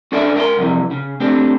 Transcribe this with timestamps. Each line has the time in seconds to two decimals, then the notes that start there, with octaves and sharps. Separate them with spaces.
0.12 C#4 D4 A4 D5 E5
0.36 A#4 G5 G#5 C6
0.57 C2 F2 C3 E3
0.91 C#3
1.20 A3 C4 D4 G4